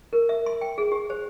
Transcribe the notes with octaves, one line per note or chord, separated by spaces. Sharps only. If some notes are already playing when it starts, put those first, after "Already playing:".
A#4
E5
C6
G5
G#4
G4
C5